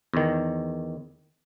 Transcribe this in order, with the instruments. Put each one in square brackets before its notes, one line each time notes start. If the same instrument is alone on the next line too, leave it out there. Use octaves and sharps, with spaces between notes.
[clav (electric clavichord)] E2 D#3